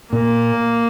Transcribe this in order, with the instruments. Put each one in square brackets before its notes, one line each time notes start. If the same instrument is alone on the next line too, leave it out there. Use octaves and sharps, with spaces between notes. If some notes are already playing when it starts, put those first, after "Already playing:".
[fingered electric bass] A#2 [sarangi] A#3